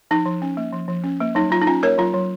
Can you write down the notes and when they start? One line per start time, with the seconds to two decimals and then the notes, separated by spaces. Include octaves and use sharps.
0.11 F3 D#4
0.26 F3
0.42 C#4
0.57 A#3
0.73 F3
0.88 F3
1.04 C#4
1.21 A#3
1.35 F#3 D#4
1.51 F#3 F4
1.61 D#4
1.67 C#4 F4
1.83 A#3 A#4 C#5
1.98 F#3 F4
2.14 F#3